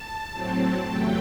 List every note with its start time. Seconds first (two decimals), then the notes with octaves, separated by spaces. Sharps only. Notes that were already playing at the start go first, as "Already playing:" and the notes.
Already playing: A5
0.33 A2 F#3 C4
0.88 E2 C3 F#3 A3 G5